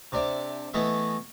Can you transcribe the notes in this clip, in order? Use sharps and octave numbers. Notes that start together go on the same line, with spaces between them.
C3 D4 E5 D6
E3 A3 B3 G#4 D#5 E5